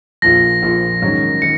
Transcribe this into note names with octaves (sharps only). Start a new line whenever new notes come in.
A#1 A#2 F3 A#6
A#1 A#2 F3
G#2 D#3 F#3 C#4
D#3 C#7